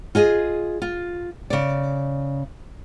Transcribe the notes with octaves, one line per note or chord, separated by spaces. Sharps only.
F4 G#4 D#5
F4
C#3 D5